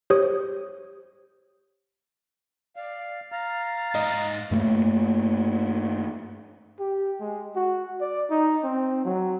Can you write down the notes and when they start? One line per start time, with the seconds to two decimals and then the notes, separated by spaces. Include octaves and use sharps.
0.10 G4 C5 C#5 D#6
2.76 D5 F5
3.32 F5 A#5 F6 A6
3.95 G#2 D#4 D#5
4.51 G2 A3 A#3
6.80 G4
7.20 G#3
7.56 F#4
8.01 D5
8.31 D#4
8.64 C4
9.05 F#3